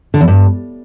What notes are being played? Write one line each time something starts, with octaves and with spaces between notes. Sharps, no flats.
D3
E2
G2